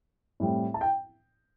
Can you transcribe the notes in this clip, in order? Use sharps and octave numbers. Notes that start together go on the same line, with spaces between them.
A2 G3 C4
A5
G5